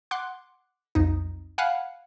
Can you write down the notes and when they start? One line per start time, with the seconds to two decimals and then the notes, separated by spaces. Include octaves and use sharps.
0.11 F#5 C6 D6 F#6
0.95 B1 F2 D#4
1.58 F5 F#5 G#5 B5 F6 F#6